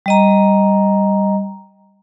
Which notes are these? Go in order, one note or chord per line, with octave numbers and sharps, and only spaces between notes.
G3 D#5 A#5